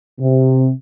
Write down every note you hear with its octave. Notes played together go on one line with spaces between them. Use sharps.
C3